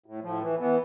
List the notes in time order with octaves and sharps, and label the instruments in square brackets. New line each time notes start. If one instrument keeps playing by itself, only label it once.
[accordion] A2
A2 F3
E3
E3 B3